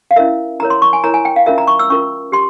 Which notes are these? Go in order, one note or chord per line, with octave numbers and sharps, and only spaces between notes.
F5
C#4 E4 A#4 E5
E4 A#4 C#5 A#5
C6
C#6
G#5
E4 A#4 C#5 A#5
G#5
G5
F5
C#4 F4 A#4 E5
A#5
C#6
E6
C#4 F4 A#4 C#6
G4 C6